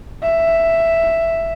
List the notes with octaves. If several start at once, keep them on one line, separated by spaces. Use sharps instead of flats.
E5